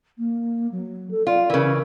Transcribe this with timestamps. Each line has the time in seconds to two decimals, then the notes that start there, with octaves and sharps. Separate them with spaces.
0.18 A#3
0.72 F#3
1.11 A4
1.27 F4 D5
1.50 C#3 E3 A#4